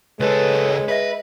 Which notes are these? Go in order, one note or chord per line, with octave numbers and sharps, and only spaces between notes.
C#2 G#3 A4 B4 C#5
B4 D#5 E5